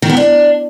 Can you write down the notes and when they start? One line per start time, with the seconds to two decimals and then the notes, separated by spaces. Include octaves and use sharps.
0.02 D#3
0.10 B3
0.17 D4